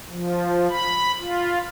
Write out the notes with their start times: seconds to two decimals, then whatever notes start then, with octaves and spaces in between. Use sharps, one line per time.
0.10 F3
0.70 B5
1.18 F4